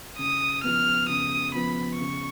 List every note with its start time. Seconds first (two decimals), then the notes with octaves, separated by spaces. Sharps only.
0.19 C#3 D#6
0.64 F3 B3 F6
1.09 C#3 D#6
1.55 F3 B3 B5
2.00 C#3 C#6